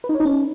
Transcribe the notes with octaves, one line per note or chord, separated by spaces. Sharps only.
B4
D#4
C#5
D#4
C#4